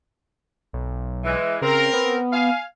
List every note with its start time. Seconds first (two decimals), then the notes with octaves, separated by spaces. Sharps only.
0.73 B1
1.24 E3 G#3
1.62 C#3 C4 A#4
1.94 B3
2.33 F5 G#5